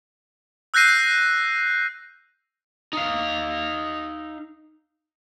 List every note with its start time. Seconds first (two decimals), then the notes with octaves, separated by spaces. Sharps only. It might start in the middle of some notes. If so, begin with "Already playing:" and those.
0.74 E6 F#6 G6 A#6 C7 D#7
2.93 D#4 F5